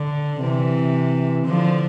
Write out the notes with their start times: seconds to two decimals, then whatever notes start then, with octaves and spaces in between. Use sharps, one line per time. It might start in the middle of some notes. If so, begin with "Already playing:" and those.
Already playing: D3
0.40 C3 E3
1.46 D3 F3